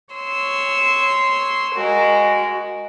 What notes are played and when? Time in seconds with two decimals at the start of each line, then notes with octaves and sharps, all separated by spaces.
0.13 C#5 C6 E6
1.74 G#3 F#4 A#4